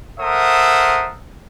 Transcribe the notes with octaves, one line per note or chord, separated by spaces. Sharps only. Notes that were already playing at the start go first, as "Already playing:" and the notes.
A4 A#4 C5 E5 F#5 D#6